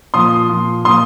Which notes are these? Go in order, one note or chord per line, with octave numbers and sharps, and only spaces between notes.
A#2 F3 C6 D#6
A#2 F3
A#2 F3 C6 D#6